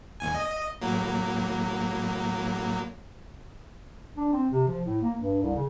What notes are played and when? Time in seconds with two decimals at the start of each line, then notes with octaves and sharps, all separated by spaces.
0.20 G1 D#2 G#5
0.35 D#5
0.81 A2 F#3 A#3
4.17 D4
4.33 C4
4.50 C3
4.68 F3
4.86 A2
5.02 A#3
5.17 G2
5.42 C2
5.55 C#3